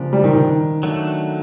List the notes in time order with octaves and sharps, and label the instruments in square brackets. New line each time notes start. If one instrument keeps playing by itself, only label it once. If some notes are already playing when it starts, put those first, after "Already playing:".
Already playing: [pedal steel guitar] C#3 F3 A#3 D4 G4
[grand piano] G3
D#3
D#3
[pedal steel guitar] F#3 A3 D4